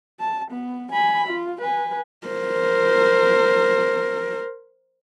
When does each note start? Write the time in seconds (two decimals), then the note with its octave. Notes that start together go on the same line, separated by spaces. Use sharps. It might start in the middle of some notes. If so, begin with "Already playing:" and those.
0.20 A5
0.51 B3
0.92 G#5 B5
1.27 F4
1.61 B4 G#5
2.27 A#4 C5